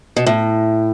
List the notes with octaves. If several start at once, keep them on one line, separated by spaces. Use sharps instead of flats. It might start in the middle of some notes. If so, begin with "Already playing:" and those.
B2
A2